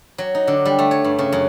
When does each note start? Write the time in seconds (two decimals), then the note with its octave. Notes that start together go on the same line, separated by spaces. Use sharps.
0.18 F#3
0.35 D#4
0.47 D3
0.65 G3
0.79 A3
0.91 C#5
1.04 G2
1.19 C#3
1.32 F#2